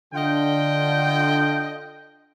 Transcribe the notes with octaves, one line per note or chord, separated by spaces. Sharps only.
D3 F4 D#5 G5